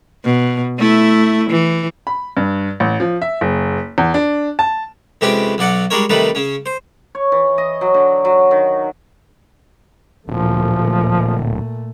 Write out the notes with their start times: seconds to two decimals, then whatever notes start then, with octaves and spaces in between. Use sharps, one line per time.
0.25 B2
0.79 A3 E4
1.51 E3
2.07 B5
2.37 G2
2.80 A1
3.00 F3
3.22 E5
3.41 F#1
3.98 E2
4.14 D4
4.59 A5
5.21 F2 C3 G#3 C#4 G4 B4
5.58 B1 F#3 D5 F#5
5.90 G3 G#3 D4 A#4 C#5
6.10 C3 D#3 G3 A3 D#4 B4
6.35 C#3 C#4
6.66 C5
7.15 C#5
7.32 E3
7.58 D#5
7.81 F#3
7.94 D3
8.25 F#3
8.51 D#3
10.28 D1 A#2 F3 A3